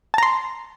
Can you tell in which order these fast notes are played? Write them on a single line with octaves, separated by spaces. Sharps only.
A5 A#5 C6